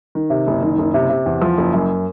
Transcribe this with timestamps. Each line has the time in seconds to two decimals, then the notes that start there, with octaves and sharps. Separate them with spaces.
0.15 D#3
0.30 C3
0.47 F#1
0.62 D#3
0.78 F#1
0.94 C3
1.10 C3
1.26 E2
1.42 F3
1.57 F#1
1.73 F#2